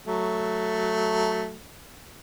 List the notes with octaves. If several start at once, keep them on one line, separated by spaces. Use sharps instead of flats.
F#3 A3